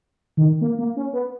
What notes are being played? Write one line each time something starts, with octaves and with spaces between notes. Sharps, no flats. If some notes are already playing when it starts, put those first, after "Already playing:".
D#3
A#3
A#3
C#4
B3